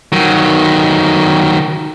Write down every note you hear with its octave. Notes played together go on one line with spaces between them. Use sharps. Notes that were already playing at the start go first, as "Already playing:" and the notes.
D#3 F#3